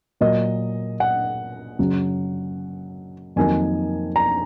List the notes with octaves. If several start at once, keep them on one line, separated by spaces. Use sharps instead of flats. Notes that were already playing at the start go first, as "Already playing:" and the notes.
A#2 F#3 A#3 D#5
F#5
F#2 C#3 F#3
F2 D#3 F#3 A#3 D#4 G#5
A#5